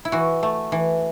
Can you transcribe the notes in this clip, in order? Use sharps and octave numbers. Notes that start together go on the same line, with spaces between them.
E4
E3 F#4
A3
E3